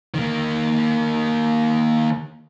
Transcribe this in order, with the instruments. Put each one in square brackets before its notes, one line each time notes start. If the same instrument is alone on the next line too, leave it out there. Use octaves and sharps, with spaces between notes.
[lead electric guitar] D#3 A#3